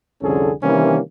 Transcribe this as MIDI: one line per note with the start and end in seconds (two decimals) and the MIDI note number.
0.22 0.51 36
0.22 0.51 41
0.22 0.51 50
0.22 0.51 61
0.22 0.51 68
0.22 0.51 69
0.63 0.99 48
0.63 0.99 51
0.63 0.99 52
0.63 0.99 55
0.63 0.99 58
0.63 0.99 61